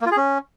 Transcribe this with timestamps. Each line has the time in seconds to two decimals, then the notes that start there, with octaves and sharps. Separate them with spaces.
0.01 A#3
0.06 F4
0.11 G#4
0.17 C#4